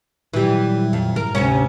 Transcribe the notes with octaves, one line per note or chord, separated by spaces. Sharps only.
A#2 D#3 E3 F#3 G3
F2
G#2 A#4
D2 C3 C#4